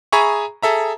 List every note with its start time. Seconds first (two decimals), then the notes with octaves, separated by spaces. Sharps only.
0.12 G#4 E5 G#5 A#5 B5 C#6
0.63 G#4 A4 E5 A#5